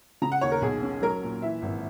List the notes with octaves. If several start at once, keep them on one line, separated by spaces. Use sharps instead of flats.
C#3 A#5
F#5
D#2 C#5
A#4
B1 G#4
C#4
F#3 A#4
A#2
E3 E5
G#1